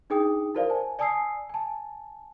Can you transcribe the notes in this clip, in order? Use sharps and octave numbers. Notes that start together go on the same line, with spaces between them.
D4 D#4 G#4 G5 D#6
E4 F#4 A#4 C5 D5 F5
G#5 A5
D5 G#5 A5 D#6 E6 C7
G#5 A5